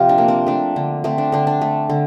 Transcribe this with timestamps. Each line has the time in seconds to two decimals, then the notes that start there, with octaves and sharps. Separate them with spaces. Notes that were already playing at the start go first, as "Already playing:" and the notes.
Already playing: C3 F3 F4 G4
0.09 D4
0.18 A#3
0.28 C4
0.47 A3 D4
0.76 D3
1.04 A3 C4
1.18 D4
1.32 D3 D4
1.47 D4
1.61 A3
1.90 D3